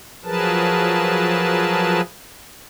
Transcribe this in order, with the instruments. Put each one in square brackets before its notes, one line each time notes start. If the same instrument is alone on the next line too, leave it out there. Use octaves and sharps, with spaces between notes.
[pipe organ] F3 F#3 G#4 A#4 B4 A5